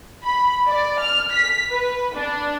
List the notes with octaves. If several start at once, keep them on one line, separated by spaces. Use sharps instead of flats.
B5
D5
F6
B6
B4
D4